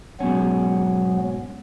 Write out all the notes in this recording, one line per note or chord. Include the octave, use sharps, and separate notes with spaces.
G#2 B2 F#3 B3 C#4